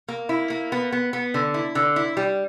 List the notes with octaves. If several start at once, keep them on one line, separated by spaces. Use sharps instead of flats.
A#3
E4
A#3
B3
B3
B3
D3
E4
D3
E4
G3